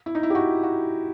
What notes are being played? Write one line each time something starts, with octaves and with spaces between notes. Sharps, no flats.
E4
D#4
E4
G4
F#4
F#4